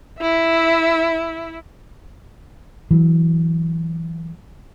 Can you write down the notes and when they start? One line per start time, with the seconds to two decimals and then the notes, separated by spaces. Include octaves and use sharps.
0.19 E4 E5
2.91 E3 F#3